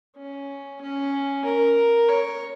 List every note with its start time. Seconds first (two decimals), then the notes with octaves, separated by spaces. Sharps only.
0.16 C#4
0.81 C#4
1.45 A#4
2.09 C#5